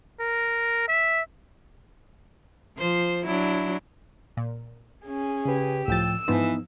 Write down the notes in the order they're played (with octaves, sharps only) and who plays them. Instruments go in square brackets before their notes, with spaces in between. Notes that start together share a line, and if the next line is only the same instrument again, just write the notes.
[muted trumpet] A#4
E5
[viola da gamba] F3 C5
F#3 D4 E4
[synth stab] A#2
[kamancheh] C#4 G#4
[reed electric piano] C#3 B4 [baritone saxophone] G4
[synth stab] C#2 G5 A6 [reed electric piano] A2 F3 [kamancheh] E6
[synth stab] G#2 F3 [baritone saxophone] E3 [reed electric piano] B3 D#4